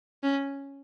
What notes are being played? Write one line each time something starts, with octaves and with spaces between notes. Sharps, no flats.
C#4